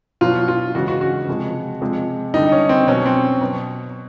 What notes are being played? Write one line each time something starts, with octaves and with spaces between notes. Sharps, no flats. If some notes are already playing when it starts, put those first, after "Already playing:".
B2 F#3 F4
F4
C#3 E3 G#3 F#4
F#4
F#4
C3 F3 G#3
C3 F3 G#3
D3 G3 D#4
C#4
C4
B2 F#3 C#4
C4
B2 F#3